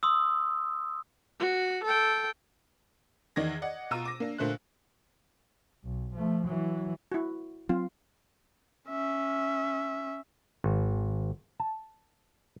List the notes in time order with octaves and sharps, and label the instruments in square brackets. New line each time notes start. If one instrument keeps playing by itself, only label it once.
[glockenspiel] C6 D#6 E6
[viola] F#4
A4 G5
[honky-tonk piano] E2 D#3 D5 D#5 G#6 A#6
D5 D#5 F#5
B2 F4 A#5 E6 D#7
D6 A#6
A#3 D4
A#2 D3 A3 C5 F#6
[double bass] B1
F3 A3
E3 F#3
[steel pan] E4 F#4
[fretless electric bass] F#3 C4 [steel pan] F4
[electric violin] C#4 E5
[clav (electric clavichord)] G#1
A5